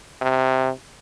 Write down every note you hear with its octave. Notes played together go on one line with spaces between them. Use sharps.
C3